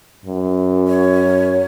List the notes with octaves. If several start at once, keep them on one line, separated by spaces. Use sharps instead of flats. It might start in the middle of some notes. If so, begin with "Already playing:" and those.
F#2
C#5